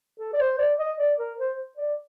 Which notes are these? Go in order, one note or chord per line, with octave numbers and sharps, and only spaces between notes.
A4
D5
C5
D5
D#5
D5
A#4
C5
D5